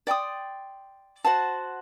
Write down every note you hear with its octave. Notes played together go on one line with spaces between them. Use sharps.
D5 G5 C6 D#6
F#4 C5 F#5 A5